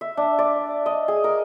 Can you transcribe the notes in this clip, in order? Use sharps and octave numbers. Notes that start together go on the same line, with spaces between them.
E5
D4
D5
D#5
G#4
A#4